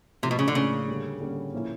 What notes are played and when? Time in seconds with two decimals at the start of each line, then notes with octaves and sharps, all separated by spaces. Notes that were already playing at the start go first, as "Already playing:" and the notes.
0.23 A2 C3 F3 A#3
0.31 B2
0.39 C#3
0.48 D3
0.55 A2 C#3 F3 A#3
0.88 D3 G3 A#3 C#4
1.20 D3 G3 A#3 C#4
1.53 A#2 F3 A#3 C#4 E4